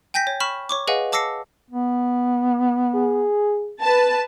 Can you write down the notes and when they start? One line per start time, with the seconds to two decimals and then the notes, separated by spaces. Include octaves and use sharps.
0.14 G5 G#5 G6 A#6 B6
0.27 C#5
0.40 B5 C#6 F6 B6 E7
0.69 C#5 C#6 D6
0.87 G#4 B4 D#5 F5 F#5 G#5
1.12 A5 D6 E6 A#6 C7 C#7
1.71 B3
2.94 G#4
3.81 B4 A5